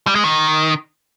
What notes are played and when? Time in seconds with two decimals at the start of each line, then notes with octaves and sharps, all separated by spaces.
0.07 G3
0.15 G#3
0.24 D#3